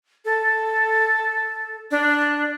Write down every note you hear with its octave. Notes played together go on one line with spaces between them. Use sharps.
A4
D4